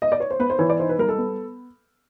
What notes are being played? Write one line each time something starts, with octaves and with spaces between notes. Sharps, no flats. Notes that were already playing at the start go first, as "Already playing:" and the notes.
D#5
D5
C#5
C5
B3 B4
C5
E3 C#5
D5
D#4 C5
B4
G3 A#4
A4
B3